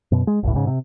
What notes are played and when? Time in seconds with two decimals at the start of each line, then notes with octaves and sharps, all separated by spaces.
0.12 F#2 B2
0.27 G#3
0.43 G1 C#2 A2
0.55 G#2 C#3
0.67 C3